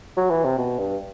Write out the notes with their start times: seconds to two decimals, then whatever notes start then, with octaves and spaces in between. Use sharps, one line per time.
0.17 F#3
0.31 E3
0.44 C3
0.58 B2
0.78 G2